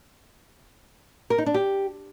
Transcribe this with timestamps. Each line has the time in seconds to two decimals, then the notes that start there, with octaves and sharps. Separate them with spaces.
1.30 A#4
1.38 D#4
1.46 D4
1.54 G4